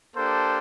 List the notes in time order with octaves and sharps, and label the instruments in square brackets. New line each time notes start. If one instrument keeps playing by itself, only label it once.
[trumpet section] A#3 D4 G4 A4 C5